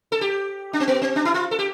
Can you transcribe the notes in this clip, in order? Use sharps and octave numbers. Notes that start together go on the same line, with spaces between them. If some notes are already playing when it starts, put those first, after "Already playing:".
A4
G4
D4
C4
B3
C4
D4
E4
F4
A4
G4